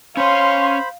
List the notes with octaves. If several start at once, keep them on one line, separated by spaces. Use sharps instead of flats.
C#4 C5 C#5 F5 B5 C6